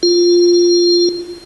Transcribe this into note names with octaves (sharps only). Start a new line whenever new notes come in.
F4